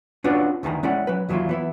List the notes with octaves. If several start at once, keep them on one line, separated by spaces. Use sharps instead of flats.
C#4 D4 F4 F#4 B4 D5
D2 D#3 E3 A5 A#5
G#3 C#4 E4 D5 F#5
F#3 B4
D#2 E3 F#3 C#4 E4 F4
E3 B3 E4